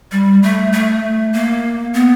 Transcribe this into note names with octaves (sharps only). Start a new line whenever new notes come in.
G3
A3
A3
A#3
B3